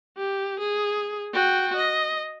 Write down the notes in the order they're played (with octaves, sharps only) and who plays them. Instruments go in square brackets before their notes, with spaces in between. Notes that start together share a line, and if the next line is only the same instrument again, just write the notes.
[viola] G4
G#4
F#4 G5
D#5